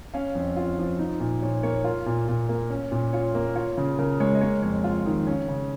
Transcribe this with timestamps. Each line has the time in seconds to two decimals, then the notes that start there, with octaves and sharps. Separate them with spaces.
0.14 C#4 F5
0.35 F2
0.57 F4
0.79 F3
0.99 D#4
1.20 A#2
1.42 A#2 C#5
1.63 A#3 C#5
1.84 F4 A#4
2.06 A#2
2.28 A#2
2.49 A#3
2.70 C#4
2.92 A#2
3.13 F4 C#5
3.35 A#3
3.55 F4 C#5
3.78 C#3
3.98 C#3 A#4
4.20 G#3 C#5
4.35 D#5
4.41 A#3 C#5
4.62 F2 C#5
4.84 F4
5.06 D#3
5.27 C#4
5.48 C#3